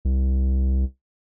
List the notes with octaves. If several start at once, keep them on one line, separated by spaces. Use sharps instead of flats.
C2